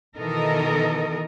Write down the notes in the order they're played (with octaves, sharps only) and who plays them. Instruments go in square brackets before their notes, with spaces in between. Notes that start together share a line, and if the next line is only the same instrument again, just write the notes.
[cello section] B2 D#3 E3 A4 A#4 D#5